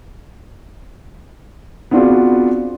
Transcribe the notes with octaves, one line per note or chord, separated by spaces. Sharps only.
B3 C4 D4 F4 F#4 G#4